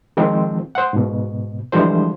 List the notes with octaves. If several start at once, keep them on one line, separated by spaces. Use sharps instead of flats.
D#3 F3 G#3 C4
C5 F#5
G#2 B2
D3 E3 F3 G3 G#3 C5